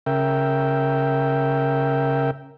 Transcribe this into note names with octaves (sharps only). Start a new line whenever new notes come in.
C#3 A#4 E5 G5